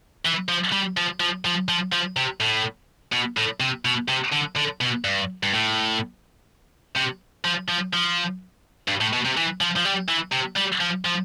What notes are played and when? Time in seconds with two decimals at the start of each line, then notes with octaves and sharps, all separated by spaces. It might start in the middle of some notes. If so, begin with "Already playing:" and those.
0.25 E3
0.48 F3
0.72 G3
0.97 F3
1.20 F3
1.45 F3
1.68 F3
1.92 F3
2.16 C3
2.41 A2
3.13 B2
3.37 A2
3.60 C3
3.85 B2
4.09 C3
4.32 D3
4.56 D3
4.81 B2
5.05 G2
5.43 G2
5.53 A2
6.96 C3
7.45 F3
7.68 F3
7.93 F3
8.88 G2
9.01 A2
9.13 B2
9.25 C3
9.37 E3
9.61 F3
9.76 F3
9.85 G3
10.09 E3
10.32 C3
10.56 G3
10.81 F3
11.05 F3